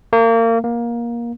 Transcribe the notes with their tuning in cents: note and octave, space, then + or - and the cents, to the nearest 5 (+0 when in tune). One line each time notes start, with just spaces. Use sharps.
A#3 -30
A#3 +20